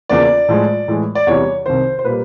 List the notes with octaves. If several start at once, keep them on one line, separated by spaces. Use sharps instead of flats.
E2 C#3 F3 A#3 D5
A2 F3 G#3
A2 E3 G#3
D5
E2 C3 E3 G3 C#5
C2 C3 D#3 C5
C5
A#2 G3 A#3 B4